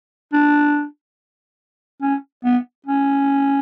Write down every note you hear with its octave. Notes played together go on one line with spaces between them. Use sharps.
D4
C#4
B3
C#4